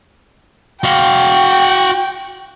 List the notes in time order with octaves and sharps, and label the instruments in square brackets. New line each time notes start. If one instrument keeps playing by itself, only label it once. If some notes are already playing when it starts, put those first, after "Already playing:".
[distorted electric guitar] F#4 F5 [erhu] G5